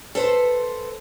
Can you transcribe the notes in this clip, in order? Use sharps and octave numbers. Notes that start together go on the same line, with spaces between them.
A4 B4 C5